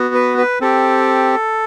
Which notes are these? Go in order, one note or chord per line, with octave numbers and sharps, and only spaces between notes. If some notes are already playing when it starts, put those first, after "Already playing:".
Already playing: B3 F#4
B4
B4
C4 G4 A4